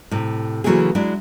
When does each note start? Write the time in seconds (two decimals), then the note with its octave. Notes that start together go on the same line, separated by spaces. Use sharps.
0.11 A2 C3
0.64 C#3 E3 F#3 A3 A#3 G#4
0.95 F#3 G#3 D4 E4